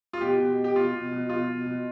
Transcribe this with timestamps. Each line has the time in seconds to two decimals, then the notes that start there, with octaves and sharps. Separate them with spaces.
0.13 F4
0.21 B2 G4
0.39 B2
0.58 B2
0.64 G4
0.75 B2 F4
0.94 B2
1.11 B2
1.29 B2 F4
1.47 B2
1.65 B2